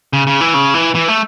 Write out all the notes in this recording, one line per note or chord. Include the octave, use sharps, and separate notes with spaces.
C#3
C#3
E3
C#3
E3
E3
A3